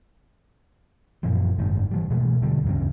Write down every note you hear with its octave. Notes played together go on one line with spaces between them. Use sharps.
F#2 A#2 E3 F3
F#1 G#2 D#3
E3 F3 G3
B2 E3 G#3 A3
E1 D3 G3
D1 E2 G2 C#3